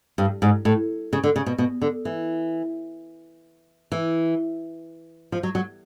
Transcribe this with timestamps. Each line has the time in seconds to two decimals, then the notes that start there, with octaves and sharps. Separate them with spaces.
0.18 G2
0.42 G#2
0.65 A2
1.13 C#3
1.24 D3
1.36 C#3
1.46 B2
1.58 B2
1.82 D3
2.05 E3
3.92 E3
5.32 F3
5.43 F#3
5.55 F#3